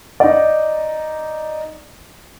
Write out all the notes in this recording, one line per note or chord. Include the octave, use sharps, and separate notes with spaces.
D#4 D5